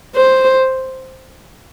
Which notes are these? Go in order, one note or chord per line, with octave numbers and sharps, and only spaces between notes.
C5